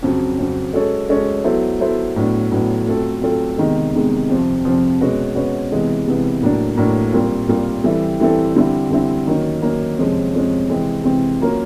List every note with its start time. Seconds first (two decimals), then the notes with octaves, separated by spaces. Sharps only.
0.02 F2 C#3 F#3
0.38 F2 C#3 F#3
0.73 G#3 C#4 F#4 A4 C#5
1.09 G#3 C#4 F#4 A4 C#5
1.44 F#3 B3 E4 A4 C5
1.80 F#3 B3 E4 A4 C5
2.16 A2 F#3 B3 D4
2.51 A2 F#3 B3 D4
2.86 F#3 A3 C4 F4 A4
3.22 F#3 A3 C4 F4 A4
3.58 E2 C3 D#3 G#3
3.93 E2 C3 D#3 G#3
4.29 F2 C3 F3
4.65 F2 C3 F3
5.00 B2 G#3 C#4 F#4 B4
5.35 B2 G#3 C#4 F#4 B4
5.71 C3 E3 G#3 B3
6.07 C3 E3 G#3 B3
6.42 A2 F#3 A#3 D4
6.77 A2 F#3 A#3 D4
7.13 A#2 G3 C4 F4 A#4
7.48 A#2 G3 C4 F4 A#4
7.84 E3 G3 C4 E4 A4
8.20 E3 G3 C4 E4 A4
8.56 D3 G3 C4 E4
8.90 D3 G3 C4 E4
9.27 D#3 F#3 A#3 C#4
9.62 D#3 F#3 A#3 C#4
9.97 F2 C3 F3 G#3 C#4
10.34 F2 C3 F3 G#3 C#4
10.69 C3 E3 G#3 C4
11.04 C3 E3 G#3 C4
11.40 F#3 A#3 C#4 F4 A#4